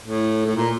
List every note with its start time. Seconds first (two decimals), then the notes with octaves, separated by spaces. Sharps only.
0.03 A2
0.46 A2
0.55 A#2